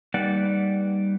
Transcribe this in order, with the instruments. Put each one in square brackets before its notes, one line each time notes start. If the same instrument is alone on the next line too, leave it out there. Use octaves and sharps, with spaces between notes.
[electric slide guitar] G3 A#3 D#4 B4 D5 F#5